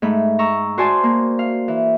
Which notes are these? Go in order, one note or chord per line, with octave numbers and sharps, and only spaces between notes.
G#2 A3 B5
A#5 C#6 E6
F#4 C5 D5 G#5 A5 C6
A#3
F5
E3